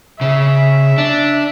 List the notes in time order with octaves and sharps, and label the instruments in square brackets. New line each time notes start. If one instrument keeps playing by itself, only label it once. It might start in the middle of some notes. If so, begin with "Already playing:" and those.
[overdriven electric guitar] C#3 [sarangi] E5
[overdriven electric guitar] D4